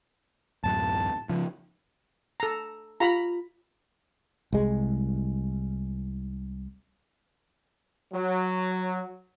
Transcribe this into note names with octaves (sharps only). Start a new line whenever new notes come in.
D1 F#2 A5
C#3 F3
A4 A#5
F4 G4 F5 A#5 B5
C2 G#3
F#3